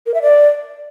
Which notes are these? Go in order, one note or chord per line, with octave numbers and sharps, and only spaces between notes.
A#4
E5
D5